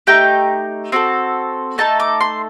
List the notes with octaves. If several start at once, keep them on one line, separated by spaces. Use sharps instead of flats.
A3 D#4 G4 G5
C4 F#4 A4
A3 D#4 A4 A5
D6
C6